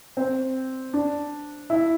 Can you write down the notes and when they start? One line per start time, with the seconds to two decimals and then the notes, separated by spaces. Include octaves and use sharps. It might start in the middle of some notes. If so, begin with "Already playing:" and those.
0.17 C4
0.93 D4
1.70 E4